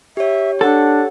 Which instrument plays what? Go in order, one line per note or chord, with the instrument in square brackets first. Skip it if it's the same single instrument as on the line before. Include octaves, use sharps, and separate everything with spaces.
[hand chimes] G4 C#5 [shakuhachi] E5
[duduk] D4 [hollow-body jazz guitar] A4 [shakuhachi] F#5